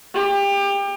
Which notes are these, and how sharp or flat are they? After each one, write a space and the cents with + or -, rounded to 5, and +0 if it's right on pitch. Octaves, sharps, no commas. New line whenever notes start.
G4 +30